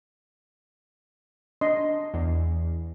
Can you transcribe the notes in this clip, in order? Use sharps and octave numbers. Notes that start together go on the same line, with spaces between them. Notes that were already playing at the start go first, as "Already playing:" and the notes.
D4 D#5 C6
E2